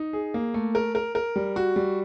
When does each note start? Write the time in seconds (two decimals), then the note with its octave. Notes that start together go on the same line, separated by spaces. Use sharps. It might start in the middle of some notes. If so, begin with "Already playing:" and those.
Already playing: D#4
0.13 G#4
0.34 A#3
0.54 A3
0.75 A#4
0.95 A#4
1.15 A#4
1.36 G3
1.56 F#4
1.76 G3